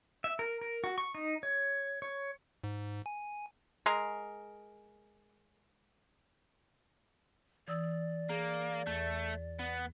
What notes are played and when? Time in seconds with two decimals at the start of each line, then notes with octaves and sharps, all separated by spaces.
0.24 E5
0.39 A#4
0.61 A#4
0.84 F#4
0.98 C#6
1.15 D#4
1.43 C#5
2.02 C#5
2.64 G#2
3.06 G#5
3.86 G#3 G#4 A#4
7.68 E3 D5 D#6 E6
8.30 A#3 G#4
8.87 E2 A3
9.59 B3